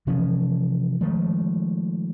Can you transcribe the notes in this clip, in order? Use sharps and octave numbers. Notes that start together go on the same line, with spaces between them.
C3 E3 F3 C#4
D#3 F3 G#3 A3